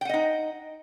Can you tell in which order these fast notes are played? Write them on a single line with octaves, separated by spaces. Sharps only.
G5 F#5 D#5 D#4